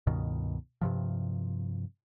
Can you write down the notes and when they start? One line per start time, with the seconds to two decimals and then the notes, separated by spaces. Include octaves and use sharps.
0.07 C#2 G2 B2 D#3
0.81 G2 C3 F3